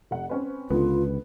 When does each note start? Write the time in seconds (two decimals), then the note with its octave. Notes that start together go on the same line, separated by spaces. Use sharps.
0.11 F1 F#5
0.29 C4 C#4 B4
0.70 C#2 D3 B3 F4